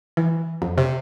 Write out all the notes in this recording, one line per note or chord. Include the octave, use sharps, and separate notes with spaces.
E3
F2
C3